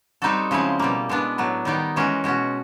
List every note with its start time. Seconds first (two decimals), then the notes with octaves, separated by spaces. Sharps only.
0.22 G3 C4 D#4 F#4 A4
0.51 C#3 F3 G#3 C4 E4
0.79 B2 G3 A#3
1.09 B2 G#3 B3 D4
1.38 A2 F#3 B3
1.65 D#3 G3 B3 D#4
1.96 E3 G#3 C#4 F#4 A#4
2.24 B2 G#3 C#4 F#4